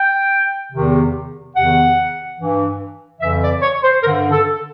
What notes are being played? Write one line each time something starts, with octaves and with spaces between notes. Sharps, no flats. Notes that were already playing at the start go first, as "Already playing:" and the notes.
Already playing: G5
E2 C3 D#3
E2 C3 D#3 F#5
G2 E3
F2 C#3 E3 E5
D5
C#5
C5
G2 D3 A#4
A4